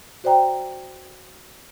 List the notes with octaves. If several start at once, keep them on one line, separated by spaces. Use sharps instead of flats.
F#4 C5 D5 G5 A#5